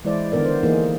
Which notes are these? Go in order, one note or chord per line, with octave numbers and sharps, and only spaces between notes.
E3 G#3 E4 C5 D5
D3 D#3 B3 A#4 D5
C5
E3 A#3 D#4 G#4